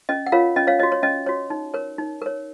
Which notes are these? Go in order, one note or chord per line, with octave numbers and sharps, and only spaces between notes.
C#4 D#5
F#5
F4 A#4 C#5 F5
C#4 D#5
C#5 F5
C#5 D#5
F#4
C#5
C#4 D#5
F#4 C#5
D#4
A#4 C#5
D#4
A#4 C#5